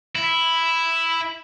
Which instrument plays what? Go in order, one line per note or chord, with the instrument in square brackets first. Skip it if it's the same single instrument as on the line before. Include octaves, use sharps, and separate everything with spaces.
[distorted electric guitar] E4